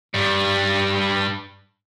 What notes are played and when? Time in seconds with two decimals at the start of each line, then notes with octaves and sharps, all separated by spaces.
0.14 G2 G3